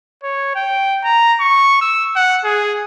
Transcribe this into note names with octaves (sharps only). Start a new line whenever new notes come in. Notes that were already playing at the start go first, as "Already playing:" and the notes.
C#5
G5
A#5
C#6
E6
F#5
G#4